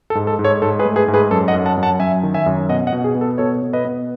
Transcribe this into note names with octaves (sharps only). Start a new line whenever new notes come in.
A4
G#2
A4
G#2
A4 C#5
G#2 A4
G#4 B4
A3
G#4 B4
G#2
G#4 B4
F#2 A4
D#5 F#5
F#2
F#5 A5
F#2
F#5 A5
F#2 E5 G#5
D#3
E5 G#5
F#2
B2 D#5 F#5
D#5 F#5
B2
G#4
B3
A4
B2 A4 C#5
B2
B4 D#5
B3